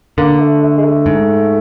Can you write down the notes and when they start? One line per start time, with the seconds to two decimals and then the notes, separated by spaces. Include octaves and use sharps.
0.18 D3 A#3
0.40 A3
0.62 A3
0.77 G#3
0.85 A3
1.06 G#2